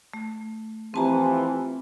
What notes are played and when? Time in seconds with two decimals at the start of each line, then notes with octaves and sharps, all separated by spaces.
0.14 A3
0.94 E3 F3 C4 G4 A5 A#5